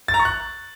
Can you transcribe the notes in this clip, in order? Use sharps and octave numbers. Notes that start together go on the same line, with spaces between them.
A6
A#5
C#6
F#6